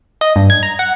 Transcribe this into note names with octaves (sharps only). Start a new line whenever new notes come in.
D#5
G2
G#6
A#5
F#5